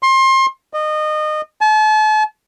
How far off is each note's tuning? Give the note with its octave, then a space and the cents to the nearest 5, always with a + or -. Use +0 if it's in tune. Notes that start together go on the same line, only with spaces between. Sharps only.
C6 +30
D#5 -25
A5 -40